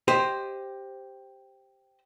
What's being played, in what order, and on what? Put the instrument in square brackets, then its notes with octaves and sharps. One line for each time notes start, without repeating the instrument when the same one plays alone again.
[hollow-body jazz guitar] G4 C5 D#5